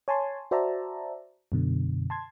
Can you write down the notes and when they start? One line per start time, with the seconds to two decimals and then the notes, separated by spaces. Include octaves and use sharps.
0.08 C#5 G#5 A5 C6
0.51 F#4 C5 D5 E5 A5 A#5
1.52 F#2 B2 D3
2.10 A5 C6 G#6